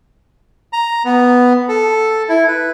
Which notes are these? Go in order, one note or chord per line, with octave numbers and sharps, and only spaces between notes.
A#5
B3
A4
E4
B4